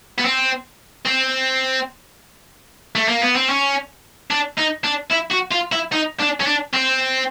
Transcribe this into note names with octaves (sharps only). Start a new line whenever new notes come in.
B3
C4
C4
A3
A#3
B3
C4
C#4
D4
D#4
D4
E4
F#4
F4
E4
D#4
D4
C#4
D4
C4